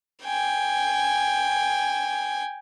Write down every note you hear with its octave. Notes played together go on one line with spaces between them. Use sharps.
G5 G#5